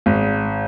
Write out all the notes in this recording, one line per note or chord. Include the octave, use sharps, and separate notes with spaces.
G#1